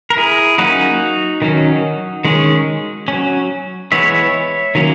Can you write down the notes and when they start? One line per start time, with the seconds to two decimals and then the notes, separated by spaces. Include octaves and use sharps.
0.10 A#4
0.17 E4 G#4
0.58 F#3 A#3 C#4 D#4 F#4
1.42 D#3 F#3 C#4
2.25 D#3 G#3 C#4
3.08 F#3 C#4
3.92 E3 G#3 B3 C#5 E5
4.75 D#3 F#3 A#3 C#4